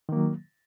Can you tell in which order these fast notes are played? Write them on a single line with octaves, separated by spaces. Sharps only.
D#3 A#3 F#3